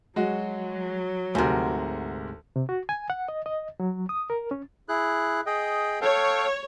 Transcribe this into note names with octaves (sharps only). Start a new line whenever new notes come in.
F#3 G#3 F#4
D2 G#2 C3 F#4 A#4
C3
F#4
G#5
F#5
D#5
D#5
F#3
D#6
A#4
C#4
E4 G#4 F#6
G#4 D#5 G5
A4 C#5 F5 G5